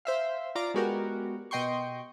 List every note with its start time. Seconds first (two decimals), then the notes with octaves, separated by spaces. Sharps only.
0.05 C5 E5 F5
0.55 F4 D5 A#5 D6
0.74 G#3 B3 F#4 G4 A#4
1.51 B2 D#5 G5 C6 C#6